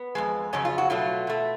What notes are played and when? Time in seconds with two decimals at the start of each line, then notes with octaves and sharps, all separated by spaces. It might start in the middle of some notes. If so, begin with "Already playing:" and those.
Already playing: B3
0.15 F2 C#3 G#3
0.53 F2 C#3 F#3 C#4
0.65 F4
0.78 F#4
0.90 B2 F#3 A3 F4
1.27 B2 A3